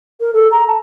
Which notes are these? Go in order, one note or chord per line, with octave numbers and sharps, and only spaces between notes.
A#4
A4
A#5
A5